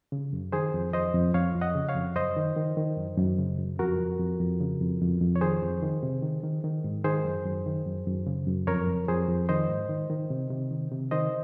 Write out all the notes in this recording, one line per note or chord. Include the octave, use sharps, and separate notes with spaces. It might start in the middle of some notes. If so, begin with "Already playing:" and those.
C#3
F#2
D#3 G#4 C5
F2
F2 C5 D#5
F2
F2 C#5 F5
F2
D#5 F#5
C#3
C#5 F5
F2
F#2 C5 D#5
D#3
D#3
D#3
F#2
F#2
C#3
F#2
F2 F#4 A#4
F2
F2
F2
C#3
F2
F2
F2
C#5
D#3 G#4 C5
F2
D#3
C3
D#3
D#3
D#3
G#2
D#3 G#4 C5
F#2
F#2
D#3
F#2
F#2
C#3
F#2
F2 A#4 C#5
F2
F2 G#4 C5
F2
D#3 C5 D#5
G#2
D#3
D#3
C3
C3
D#3
C3
D#3 C5 D#5